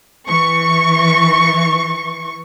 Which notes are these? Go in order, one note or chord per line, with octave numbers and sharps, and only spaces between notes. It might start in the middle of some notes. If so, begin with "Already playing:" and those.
E3 C#6